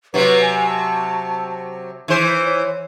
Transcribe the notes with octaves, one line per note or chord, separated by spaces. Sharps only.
C3 F#3 B4
G#5
A5
E3 E4 C5
C#5